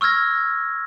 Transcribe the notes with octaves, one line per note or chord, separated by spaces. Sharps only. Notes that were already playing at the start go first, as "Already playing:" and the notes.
C#6 E6 F6 G#6 A#6